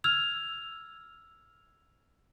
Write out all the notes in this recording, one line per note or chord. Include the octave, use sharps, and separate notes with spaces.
E6 F6 G#6 F7